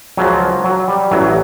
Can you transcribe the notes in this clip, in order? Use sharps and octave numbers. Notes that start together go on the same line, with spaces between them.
C#2 C#3 F3 F#3
F#3
G3
A1 A2 E3 F#3